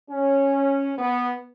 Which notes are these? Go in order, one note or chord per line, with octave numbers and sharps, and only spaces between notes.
C#4
B3